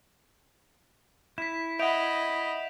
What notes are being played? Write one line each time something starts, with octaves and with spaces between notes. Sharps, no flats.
E4 B6 E7
D#5 E5 F#5 B5 G6 D7 F7